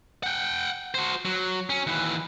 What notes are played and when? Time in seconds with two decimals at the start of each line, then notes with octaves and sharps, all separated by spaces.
0.23 F#5 G5
0.94 F#4 C5
1.25 F#3
1.70 C#4
1.87 D#2 E3